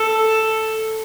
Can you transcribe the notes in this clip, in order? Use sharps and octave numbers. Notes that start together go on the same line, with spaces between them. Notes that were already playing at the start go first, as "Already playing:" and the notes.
Already playing: A4